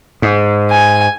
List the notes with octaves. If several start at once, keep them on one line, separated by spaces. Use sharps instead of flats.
G#2
G#5